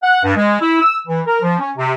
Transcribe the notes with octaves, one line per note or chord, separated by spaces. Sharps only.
F#5
G2
G#3
E4
E6
E3
A#4
F3
C#4
C3